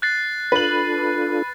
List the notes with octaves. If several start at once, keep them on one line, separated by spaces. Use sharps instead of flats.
F#6 A6 C7
D4 F4 A4 B4 F#7